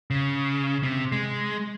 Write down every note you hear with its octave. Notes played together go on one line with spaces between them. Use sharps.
C#3
C3
G#3